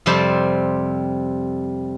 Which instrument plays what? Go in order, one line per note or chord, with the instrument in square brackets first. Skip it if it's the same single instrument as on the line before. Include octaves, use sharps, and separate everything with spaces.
[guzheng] F2 C3 G3 C4 C5 A5